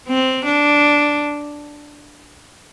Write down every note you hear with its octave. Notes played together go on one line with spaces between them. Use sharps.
C4
D4